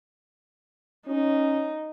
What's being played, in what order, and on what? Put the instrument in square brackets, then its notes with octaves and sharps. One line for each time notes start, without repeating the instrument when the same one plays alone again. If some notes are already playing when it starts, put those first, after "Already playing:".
[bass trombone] C#4 [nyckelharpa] D#4